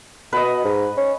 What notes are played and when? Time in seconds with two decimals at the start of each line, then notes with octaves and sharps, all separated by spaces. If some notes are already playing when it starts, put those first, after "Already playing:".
0.33 B2 B4 D#5
0.64 G#2
0.97 C#4